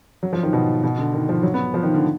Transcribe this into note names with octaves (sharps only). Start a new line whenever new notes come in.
F#3
F3
D#3
B2
B2
D3
D#3
F3
F#3
B3
F3
D#3
D3